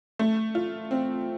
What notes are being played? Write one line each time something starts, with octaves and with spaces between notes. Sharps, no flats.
A3
F4
C4